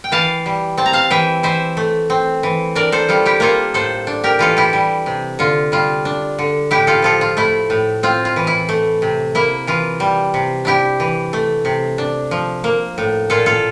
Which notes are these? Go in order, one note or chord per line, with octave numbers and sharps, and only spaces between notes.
G5
E3 F5 A5
G3
C4 A5
A#5
F5 A5
E3 E5 G5
E3 C5 E5
A3
C4
E3
D4 A#4 D5
A4 C5
G3 F4 A4
E4 G4
A#3 F4 A4
A2 A4 C5
D4
G4 A#4
E3 F4 A4
E4 G4
G3
C3
D3 F4
G3 F4
D4
D3
A2 E4 G4
F4 A4
F3 F4 A4
F4
A3 E4
A2
C4 F4
F4
E3
E4
A3
C3
A#3 E4
E3 F4
G3
C3
D4 E4 G4
E3
A3
C3
D4
F3
A#3
A2
A#2 F4 A4
F4 A4